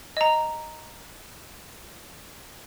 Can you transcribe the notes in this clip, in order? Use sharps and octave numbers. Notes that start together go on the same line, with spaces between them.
D#5 A#5